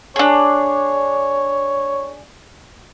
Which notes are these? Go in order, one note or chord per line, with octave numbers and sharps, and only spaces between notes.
D4 G#4 C#5